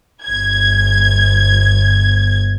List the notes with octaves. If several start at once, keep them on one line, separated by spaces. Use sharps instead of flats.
G1 G#6